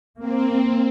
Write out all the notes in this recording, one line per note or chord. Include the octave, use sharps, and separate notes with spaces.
A#3 C4